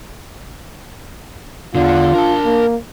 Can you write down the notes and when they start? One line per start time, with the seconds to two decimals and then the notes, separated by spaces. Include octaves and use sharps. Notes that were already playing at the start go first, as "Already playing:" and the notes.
1.75 E2 D3 D4 F4
2.14 D4 A#4 A5
2.45 A#3